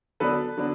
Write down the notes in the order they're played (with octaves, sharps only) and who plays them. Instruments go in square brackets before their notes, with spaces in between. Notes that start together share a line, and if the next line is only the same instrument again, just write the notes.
[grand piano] D3 F#3 B3 D4 A4 B4
D3 F#3 B3 D4